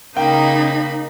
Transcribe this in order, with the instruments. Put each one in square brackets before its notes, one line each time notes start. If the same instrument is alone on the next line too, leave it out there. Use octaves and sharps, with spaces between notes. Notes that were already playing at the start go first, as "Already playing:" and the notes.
[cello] C#3 D#4 [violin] A#3 B5 [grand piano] G5